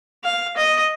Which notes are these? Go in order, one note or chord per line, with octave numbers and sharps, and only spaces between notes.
F5
D#5